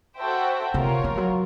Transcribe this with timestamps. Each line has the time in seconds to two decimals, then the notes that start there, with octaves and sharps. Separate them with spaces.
0.17 F#4 A4 C5 E5 G5
0.74 C3 F4 A#4 C#5
1.04 F3
1.17 F#3